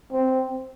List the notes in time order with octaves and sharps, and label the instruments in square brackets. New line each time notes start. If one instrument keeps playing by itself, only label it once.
[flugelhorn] C4